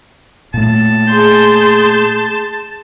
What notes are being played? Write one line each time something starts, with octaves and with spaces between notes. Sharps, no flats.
A#2 A3 A5
G#4 C6 G6